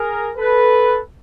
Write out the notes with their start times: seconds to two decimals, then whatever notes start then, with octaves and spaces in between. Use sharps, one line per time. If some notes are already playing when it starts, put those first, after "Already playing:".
Already playing: G#4 A#4
0.38 A4 B4